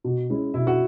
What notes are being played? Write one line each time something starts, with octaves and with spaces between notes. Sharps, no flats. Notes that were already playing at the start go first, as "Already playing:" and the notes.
B2
G#3 C#4 E4
B2 E4
F#4